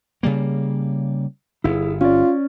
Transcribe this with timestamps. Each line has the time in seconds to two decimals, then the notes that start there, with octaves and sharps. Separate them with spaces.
0.23 C#3 G3 A#3
1.64 G1 E4 G#4
2.01 C#4 F4 D5